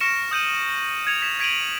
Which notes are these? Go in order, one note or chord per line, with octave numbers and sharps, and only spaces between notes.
C#6 F6 A#6 C#7 D7 E7
D#6 G6 D#7 F#7
G#6 C#7 F7
G#6 B6 E7
G#6 B6 D7 D#7 F7 F#7